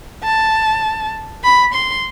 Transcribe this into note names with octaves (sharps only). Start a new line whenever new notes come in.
A5
B5
C6